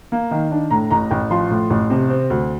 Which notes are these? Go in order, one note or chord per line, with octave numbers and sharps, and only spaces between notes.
A#3
D#3
D4
A2 A#5
A1 A#5
A1 G5
F3 C6
A2
A1
C3
C4
D2